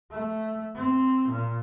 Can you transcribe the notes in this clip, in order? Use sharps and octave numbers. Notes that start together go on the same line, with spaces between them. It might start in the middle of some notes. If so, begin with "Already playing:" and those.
A3
C4
A#2